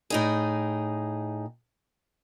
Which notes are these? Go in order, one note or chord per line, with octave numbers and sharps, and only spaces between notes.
A2 D#4 G#4